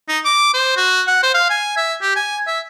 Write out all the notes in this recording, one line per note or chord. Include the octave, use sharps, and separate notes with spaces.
D#4
D6
C5
F#4
F#5
C5
F5
G#5
E5
G4
G#5
E5